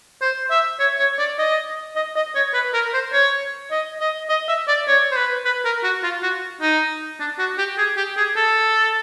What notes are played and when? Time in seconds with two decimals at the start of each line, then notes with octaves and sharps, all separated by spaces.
0.22 C5
0.51 E5
0.80 C#5
0.99 C#5
1.19 D5
1.39 D#5
1.96 D#5
2.16 D#5
2.35 C#5
2.54 B4
2.74 A#4
2.94 C5
3.13 C#5
3.71 D#5
4.00 D#5
4.29 D#5
4.48 E5
4.68 D5
4.88 C#5
5.11 C5
5.16 B4
5.45 B4
5.65 A#4
5.84 F#4
6.03 F4
6.23 F#4
6.61 D#4
7.20 D4
7.39 F#4
7.58 G4
7.78 G#4
7.97 G4
8.17 G#4
8.36 A4